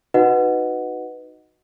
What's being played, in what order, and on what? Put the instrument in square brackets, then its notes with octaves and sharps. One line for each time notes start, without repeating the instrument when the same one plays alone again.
[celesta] D#4 F#4 B4 D#5 F#5